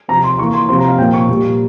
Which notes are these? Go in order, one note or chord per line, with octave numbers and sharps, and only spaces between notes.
C3 F3 C4 A#5
C6
E3 A#3 C#6
C6
C3 F3 C4 C6
A#5
F5
A#2 F3 A#3 G5
C#6
A#2 G3 A#3